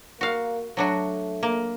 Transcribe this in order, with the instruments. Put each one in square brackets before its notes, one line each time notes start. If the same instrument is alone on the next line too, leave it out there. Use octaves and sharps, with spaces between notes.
[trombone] A#3 [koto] F#4 F5
[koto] F#3 D4 F#4 [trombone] A3
[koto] A#3